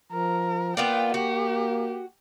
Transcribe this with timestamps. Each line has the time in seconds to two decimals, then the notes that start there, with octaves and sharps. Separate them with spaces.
0.12 F3 A#4
0.77 A#3 B3 F4 D5 G5
1.14 F#4 G4